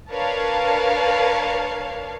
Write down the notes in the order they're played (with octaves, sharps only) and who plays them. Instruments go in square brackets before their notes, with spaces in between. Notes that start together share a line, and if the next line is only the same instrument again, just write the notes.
[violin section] D4 A#4 B4 C#5 F5 A5